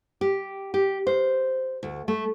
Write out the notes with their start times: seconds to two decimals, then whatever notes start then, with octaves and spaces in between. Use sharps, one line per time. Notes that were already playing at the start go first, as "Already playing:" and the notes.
0.21 G4
0.74 G4
1.07 C5
1.83 D2
2.08 A3